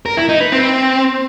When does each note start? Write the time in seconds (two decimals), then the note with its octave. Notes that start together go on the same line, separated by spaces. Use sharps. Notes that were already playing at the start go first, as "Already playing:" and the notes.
0.06 A#4
0.17 E4
0.29 D#4
0.41 B4
0.52 C4